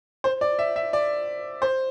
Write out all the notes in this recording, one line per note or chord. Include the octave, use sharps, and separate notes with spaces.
C5
D5
E5
E5
D5
C5